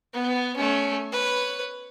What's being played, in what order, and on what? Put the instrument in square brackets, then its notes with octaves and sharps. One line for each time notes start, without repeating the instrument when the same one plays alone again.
[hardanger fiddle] B3
A3 C#4
B4 C#5